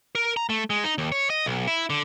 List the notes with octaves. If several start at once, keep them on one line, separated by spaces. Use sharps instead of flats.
A#4
A#5
A3
G#3
D#4
D#2
C#5
D#5
B1
E4
D3